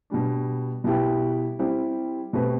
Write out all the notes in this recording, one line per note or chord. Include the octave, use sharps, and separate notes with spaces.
B2 G3 D4
B2 G3 B3 E4 G4
G3 C4 E4 G4
B2 A3 C4 G4 B4